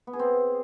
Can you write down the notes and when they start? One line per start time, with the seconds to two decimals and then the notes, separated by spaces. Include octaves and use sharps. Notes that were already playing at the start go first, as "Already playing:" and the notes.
0.07 B3
0.13 G#4
0.19 C4